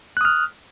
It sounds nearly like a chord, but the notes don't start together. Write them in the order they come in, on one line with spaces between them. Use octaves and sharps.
F#6 D#6 F6